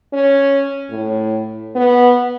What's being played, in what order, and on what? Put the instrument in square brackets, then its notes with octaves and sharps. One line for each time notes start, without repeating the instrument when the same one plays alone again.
[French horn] C#4
A2
B3